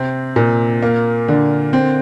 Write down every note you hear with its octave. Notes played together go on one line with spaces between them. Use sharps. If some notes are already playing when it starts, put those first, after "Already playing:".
Already playing: C3 C4
A#2
A#3
D3
C4